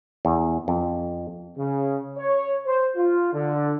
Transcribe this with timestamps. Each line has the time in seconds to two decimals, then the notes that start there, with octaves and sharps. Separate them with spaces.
0.25 E2
0.68 F2
1.58 C#3
2.18 C#5
2.66 C5
2.96 F4
3.34 D3